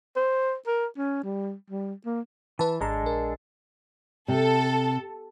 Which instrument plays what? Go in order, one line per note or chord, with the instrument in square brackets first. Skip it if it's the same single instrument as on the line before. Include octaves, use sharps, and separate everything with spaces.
[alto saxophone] C5
A#4
C#4
G3
G3
A#3
[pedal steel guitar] E3 [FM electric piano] B4 A5
[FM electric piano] G#1 A#5 [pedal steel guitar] G#3 D4 A4
[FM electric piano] A#1 A#4
[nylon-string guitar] C3 [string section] A4